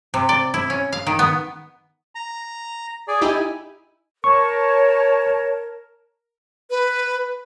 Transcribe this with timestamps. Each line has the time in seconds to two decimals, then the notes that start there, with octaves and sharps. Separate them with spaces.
0.14 C3
0.29 D5
0.54 E4
0.70 C#4
0.92 F5
1.07 D#3
1.19 B3
2.15 A#5
3.08 G#4 D5
3.21 D#4 E4 G4 G#5
4.24 A#4 C#5 A5 C#6
6.70 B4